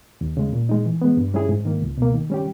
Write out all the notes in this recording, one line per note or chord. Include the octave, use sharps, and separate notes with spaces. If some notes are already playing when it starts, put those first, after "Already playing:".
D#2
C#3 G#3
A#2
G#3 D#4
E3
G#3 B3
G2
G3 C#4 E4 G#4
G#2
D#3 A#3
C#2
B2 A#3
D#3
G3 C#4 G4